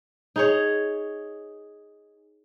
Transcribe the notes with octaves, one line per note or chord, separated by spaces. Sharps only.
D#4 G#4 C#5